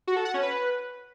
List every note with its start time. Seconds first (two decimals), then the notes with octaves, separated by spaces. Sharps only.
0.07 F#4
0.16 A4
0.25 F#5
0.34 C#4
0.43 B4